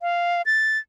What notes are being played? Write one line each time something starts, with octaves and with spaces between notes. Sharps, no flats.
F5
A6